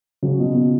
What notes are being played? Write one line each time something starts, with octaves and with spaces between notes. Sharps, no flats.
C#3 F#3
B2
B2